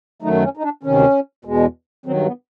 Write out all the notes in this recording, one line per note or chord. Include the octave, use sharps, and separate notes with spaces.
F#2 D#3 F#3 A3 D#4
C#4
D#4
D4
D2 C3 D#3 C#4
E2 B2 G#3
G2 D#3 F#3 C4
B3